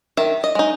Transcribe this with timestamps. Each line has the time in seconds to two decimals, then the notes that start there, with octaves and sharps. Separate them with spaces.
0.17 D#3 E5
0.44 D#5
0.55 G#3 D#4